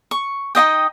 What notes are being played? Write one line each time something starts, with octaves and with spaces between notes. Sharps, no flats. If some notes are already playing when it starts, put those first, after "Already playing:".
C#6
D#4 F4 D#5 G5